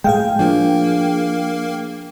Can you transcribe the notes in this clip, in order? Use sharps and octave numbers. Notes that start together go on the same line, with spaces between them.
A2 G#3 G#4 F5 G5
F3 A#3 D4 A#4